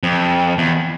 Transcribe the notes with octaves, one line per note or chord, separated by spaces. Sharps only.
F2
E2